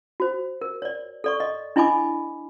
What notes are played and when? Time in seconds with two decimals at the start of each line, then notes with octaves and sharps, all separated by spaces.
0.20 F#4 C5
0.61 A#4
0.82 C#5 D5
1.24 A4 D5 C#6
1.40 D#5
1.76 D4 E4 D#5 G#5 B5 D6